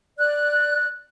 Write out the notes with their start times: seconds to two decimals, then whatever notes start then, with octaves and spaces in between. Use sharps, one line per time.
0.18 D5 F#6